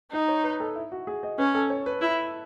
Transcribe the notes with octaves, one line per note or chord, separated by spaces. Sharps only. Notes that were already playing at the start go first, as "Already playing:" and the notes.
D#4 D#5
C#5
B4
A4
E4
F#4
G#4
D#5
C#4 B4
A4
C#5
B4
E4